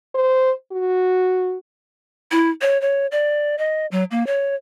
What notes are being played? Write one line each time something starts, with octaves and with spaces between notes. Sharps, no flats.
C5
F#4
E4
C#5
C#5
D5
D#5
F#3
A#3
C#5